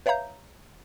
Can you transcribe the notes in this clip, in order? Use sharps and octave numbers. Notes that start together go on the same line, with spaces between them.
B4 C#5 E5 F5 A#5 G6